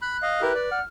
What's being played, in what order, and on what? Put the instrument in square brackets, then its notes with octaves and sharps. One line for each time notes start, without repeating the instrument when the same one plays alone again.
[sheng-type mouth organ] B5 [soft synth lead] F#6
[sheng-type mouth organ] D#5 F5
[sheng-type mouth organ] E4 G4 A#4 [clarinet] B4
[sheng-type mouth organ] D5
[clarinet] F#5 [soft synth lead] F6